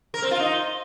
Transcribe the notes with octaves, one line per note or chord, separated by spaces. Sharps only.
A#4
C4
F4
D#4